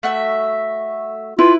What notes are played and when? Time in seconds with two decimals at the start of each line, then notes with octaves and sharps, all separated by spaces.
0.03 A3 F#4 E5
1.39 E4 F4 B4